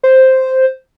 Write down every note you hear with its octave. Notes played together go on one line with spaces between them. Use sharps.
C5